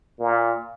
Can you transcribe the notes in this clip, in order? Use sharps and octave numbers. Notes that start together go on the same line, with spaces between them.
A#2